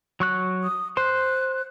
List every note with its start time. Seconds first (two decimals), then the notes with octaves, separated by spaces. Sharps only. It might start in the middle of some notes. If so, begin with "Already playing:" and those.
0.20 F#3 C#6 F#6
0.64 D#6
0.97 C5 C6 F#6